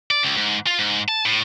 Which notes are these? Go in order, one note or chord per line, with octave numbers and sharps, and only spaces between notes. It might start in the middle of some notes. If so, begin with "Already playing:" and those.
D5
C#2
G#2
F4
G#2
A5
A2